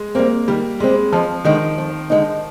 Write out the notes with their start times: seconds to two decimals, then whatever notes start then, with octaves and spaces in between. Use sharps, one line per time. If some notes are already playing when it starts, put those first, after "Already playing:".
Already playing: G#3
0.15 G3 A#3 C4
0.48 D#3 G3
0.80 G3 G#3 C4
1.13 F2 F3
1.45 D3 D#3 G#3 D#4
1.78 F2
2.10 D3 G#3 D#4